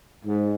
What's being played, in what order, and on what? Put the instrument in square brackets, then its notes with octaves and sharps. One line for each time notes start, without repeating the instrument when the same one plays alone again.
[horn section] G#2